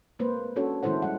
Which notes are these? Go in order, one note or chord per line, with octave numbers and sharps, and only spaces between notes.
G#3 A#3 B4 C5
C#4 D4 F#4 A4 C#5
D#3 G#3 E4 A4 C5 F#5
D#3 G3 C5 F#5